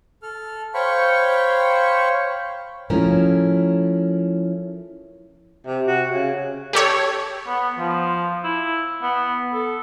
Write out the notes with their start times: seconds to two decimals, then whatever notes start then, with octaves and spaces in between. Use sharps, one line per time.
0.22 A4 F6
0.74 C5 C#5 F5 G5 B5 C#6
2.90 F3 A3 C#4 E4 A#4
5.66 C3
5.87 F#4
6.10 C#3
6.73 G4 A4 C#5
7.47 B3
7.78 F3
8.44 E4
9.02 B3
9.53 A4